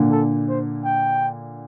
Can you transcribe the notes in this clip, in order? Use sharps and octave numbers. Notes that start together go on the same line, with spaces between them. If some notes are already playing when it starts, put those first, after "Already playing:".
Already playing: A#2 D3
A4
C5
G5